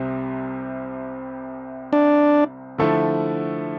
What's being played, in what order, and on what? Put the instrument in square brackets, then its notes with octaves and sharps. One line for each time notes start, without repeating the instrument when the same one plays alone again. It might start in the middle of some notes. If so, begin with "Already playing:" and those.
Already playing: [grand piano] C2 C3 G3 C4
[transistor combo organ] D4
[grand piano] D3 F3 A3 E4 A4